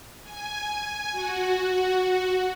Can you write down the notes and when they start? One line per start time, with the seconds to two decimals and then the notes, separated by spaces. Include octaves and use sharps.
0.24 G#5
1.12 F#4